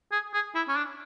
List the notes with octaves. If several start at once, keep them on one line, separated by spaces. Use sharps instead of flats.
G#4
G#4
E4
C#4
D4